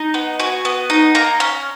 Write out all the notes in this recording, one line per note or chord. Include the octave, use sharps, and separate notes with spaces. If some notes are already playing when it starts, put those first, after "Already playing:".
Already playing: D#4
B3
F#4 G#5
B3
D#4
A#3 A#5
C#4